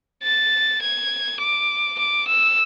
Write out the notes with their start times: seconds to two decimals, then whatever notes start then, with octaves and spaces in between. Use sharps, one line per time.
0.23 A6
0.82 G#6
1.40 D6
1.99 D6
2.28 E6